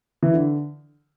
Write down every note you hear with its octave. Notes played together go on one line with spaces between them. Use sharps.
E3
D3